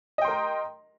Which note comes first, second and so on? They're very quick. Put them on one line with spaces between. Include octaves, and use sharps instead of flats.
D#5 G5 C6 A#4 A#5